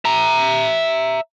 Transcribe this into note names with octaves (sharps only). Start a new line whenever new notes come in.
E5 A#5